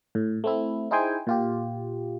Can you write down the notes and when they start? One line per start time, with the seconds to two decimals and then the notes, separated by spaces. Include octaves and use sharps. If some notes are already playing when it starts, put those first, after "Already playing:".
0.15 A2
0.44 A3 C4 E4
0.91 D#4 E4 G#4 C5 G5 G#5
1.27 A#2 F4 G4